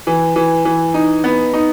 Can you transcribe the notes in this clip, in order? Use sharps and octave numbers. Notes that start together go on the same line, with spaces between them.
E3
E3
E3
D#4
B3
D#4